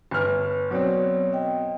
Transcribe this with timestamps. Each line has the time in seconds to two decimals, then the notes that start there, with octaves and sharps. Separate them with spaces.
0.11 G1 B4 F6
0.71 B2 F#3 C4 C#5 D5
1.33 D#5 G5